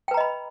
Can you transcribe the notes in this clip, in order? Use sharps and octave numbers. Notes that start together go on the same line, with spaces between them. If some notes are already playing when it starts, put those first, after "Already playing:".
B4 D#5 G5 A#5 B5